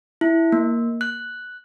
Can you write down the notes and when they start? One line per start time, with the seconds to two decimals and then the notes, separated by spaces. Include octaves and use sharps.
0.21 E4
0.52 A#3
1.01 F#6